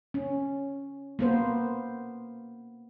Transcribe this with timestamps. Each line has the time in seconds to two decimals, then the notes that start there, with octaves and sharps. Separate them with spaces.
0.14 C#4
1.19 A#3 B3 C5